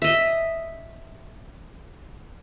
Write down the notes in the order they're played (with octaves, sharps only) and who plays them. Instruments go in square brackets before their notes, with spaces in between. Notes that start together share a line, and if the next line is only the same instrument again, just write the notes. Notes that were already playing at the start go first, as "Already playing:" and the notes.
[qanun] D#5 E5